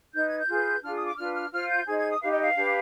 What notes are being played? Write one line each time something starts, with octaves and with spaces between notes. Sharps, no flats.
D#4 B4 G6
G#6
G6
F4 G#4 B4
D4 F4 G#4 F6
D#6
D6
D4 F4 B4 F6
F6
F4 C5 F6
G6
D#4 G#4 C5 G#6
G#6
D#6
D#4 G4 B4 F5
D#5
F5
D4 G4 B4